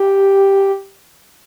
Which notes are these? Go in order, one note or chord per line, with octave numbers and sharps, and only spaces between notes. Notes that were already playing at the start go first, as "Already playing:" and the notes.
Already playing: G4